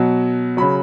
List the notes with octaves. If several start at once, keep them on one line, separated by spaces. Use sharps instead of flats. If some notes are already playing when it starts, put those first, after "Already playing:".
Already playing: B2 F#3
C#3 F#3 B5